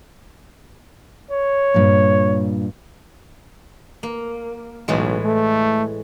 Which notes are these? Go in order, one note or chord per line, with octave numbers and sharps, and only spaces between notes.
C#5
G2 A#2
A#3
B1 A2 E3 G#3
A3